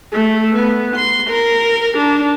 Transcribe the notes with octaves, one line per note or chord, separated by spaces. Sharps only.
A3
B3
C6
A#4
D4